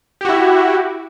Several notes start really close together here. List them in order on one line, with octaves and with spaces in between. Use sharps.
G4 F#4 E4